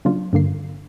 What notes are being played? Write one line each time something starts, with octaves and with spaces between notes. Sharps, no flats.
C#3 F#3 A#3 D4 F4
G2 D3 A#3 C7